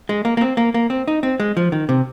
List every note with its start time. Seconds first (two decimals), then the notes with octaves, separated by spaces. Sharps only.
0.09 G#3
0.25 A#3
0.37 A#3
0.41 C4
0.57 A#3
0.74 A#3
0.90 C4
1.08 D#4
1.23 C4
1.40 G#3
1.57 F3
1.72 D#3
1.89 C3